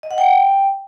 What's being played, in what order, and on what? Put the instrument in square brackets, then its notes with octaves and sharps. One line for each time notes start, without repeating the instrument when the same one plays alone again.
[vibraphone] D#5
F#5
G5